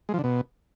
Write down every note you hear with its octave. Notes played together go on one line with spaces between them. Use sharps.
G#3
F3
D3
B2